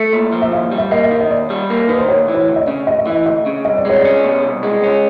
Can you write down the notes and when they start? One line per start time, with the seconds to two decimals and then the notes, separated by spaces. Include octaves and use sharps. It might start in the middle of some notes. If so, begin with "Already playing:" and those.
Already playing: A3
0.13 A#2
0.33 F3
0.42 E5
0.52 D#2 F5
0.72 G3
0.78 E5
0.91 A#3 D#5
1.04 E5
1.11 D#3
1.21 D#5
1.30 D#2 D5
1.50 G3
1.70 A#3
1.88 D#3 B4
1.98 C5
2.09 D2 C#5
2.28 E3
2.35 C#5
2.48 D2
2.56 D#5
2.61 D5
2.68 C#3
2.87 D2 D#5
2.98 E5
3.07 E3 D#5
3.26 D2 D#5
3.46 C#3
3.65 C2 D#5
3.77 D5
3.85 G#3 C#5
4.01 C#4 D5
4.24 B2
4.43 C2
4.63 G#3
4.83 C#4